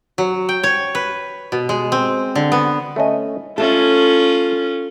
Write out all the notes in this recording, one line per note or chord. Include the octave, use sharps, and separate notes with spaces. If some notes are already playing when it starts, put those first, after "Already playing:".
F#3
G5
C#5
B4
B2
G#3
C4
D3
B3
A3 C#4 D#5
A3 C#4 F4 A4 A5